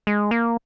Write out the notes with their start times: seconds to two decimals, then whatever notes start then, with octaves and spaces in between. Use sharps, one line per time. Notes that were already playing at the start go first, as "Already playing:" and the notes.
0.07 G#3
0.31 A#3